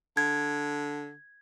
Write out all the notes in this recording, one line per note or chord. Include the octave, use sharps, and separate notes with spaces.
D3 G#6